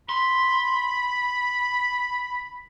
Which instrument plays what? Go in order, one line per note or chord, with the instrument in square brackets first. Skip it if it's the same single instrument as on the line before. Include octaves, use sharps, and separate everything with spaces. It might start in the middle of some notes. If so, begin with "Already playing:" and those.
[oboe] B5 [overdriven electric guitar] C6